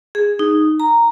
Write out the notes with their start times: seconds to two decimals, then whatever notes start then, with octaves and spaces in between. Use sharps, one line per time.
0.15 G#4
0.39 D#4
0.80 A#5